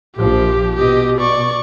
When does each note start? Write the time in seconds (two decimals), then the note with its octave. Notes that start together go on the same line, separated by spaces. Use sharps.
0.17 A#1 F3 G4
0.76 B2 G4 D#5
1.17 D5 C#6